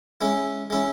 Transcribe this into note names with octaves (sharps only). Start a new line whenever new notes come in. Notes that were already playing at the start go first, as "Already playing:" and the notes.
G#3 C#4 E4
G#3 C#4 E4